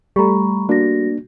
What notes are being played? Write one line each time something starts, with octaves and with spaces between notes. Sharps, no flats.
G3 A3 A#5 B5 C#6
A#3 D4 F#4 A#6